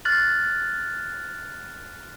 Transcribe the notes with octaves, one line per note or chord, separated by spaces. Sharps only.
F6 F#6 A6 F#7